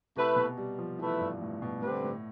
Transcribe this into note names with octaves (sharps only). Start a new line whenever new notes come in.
C3 A3 E4 B4
B2
G3
F3
E3 A3 E4 B4
G2
A2
B2
A2 D3 G3 C4 G4 B4
A2